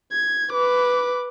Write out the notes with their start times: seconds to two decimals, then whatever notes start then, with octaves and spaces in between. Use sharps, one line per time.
0.12 G#6
0.52 B4 D6